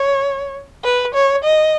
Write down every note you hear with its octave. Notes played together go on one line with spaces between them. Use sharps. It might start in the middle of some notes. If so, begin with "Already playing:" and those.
Already playing: C#5
B4
C#5
D#5